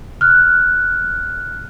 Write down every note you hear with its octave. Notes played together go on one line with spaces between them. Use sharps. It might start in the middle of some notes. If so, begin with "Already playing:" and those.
F6 F#6